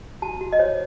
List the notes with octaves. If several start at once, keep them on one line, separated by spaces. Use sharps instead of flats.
F#4 A5
F#4
D#5
C5 C#5